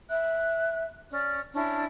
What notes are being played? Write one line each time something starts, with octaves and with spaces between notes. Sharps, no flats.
E5 F#6
C#4 D5
C#4 D4 E4